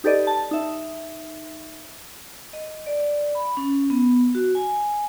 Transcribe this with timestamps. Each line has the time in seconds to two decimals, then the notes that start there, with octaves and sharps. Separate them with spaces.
0.04 D#4 G4 A4 B4 D5 D#5
0.27 A5
0.51 D#4 E5
2.53 D#5
2.86 D5
3.35 B5
3.57 C#4
3.90 B3
4.35 F#4
4.55 G#5